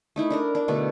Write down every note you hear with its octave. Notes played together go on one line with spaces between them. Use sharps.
A3 D#4 E4
D4 A#4 A#5
D4
B2 D3 A3